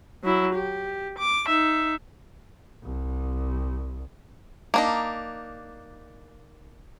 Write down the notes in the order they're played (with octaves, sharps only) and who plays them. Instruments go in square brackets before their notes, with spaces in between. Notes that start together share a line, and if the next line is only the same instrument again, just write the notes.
[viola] F#3 E4
G4
D6
D#4 E5
[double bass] C2
[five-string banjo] A#3 D4 D#4